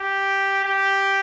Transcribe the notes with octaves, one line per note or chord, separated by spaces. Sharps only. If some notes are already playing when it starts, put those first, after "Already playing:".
Already playing: G4
G4